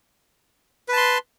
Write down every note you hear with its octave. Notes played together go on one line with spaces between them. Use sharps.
B4 A5 C6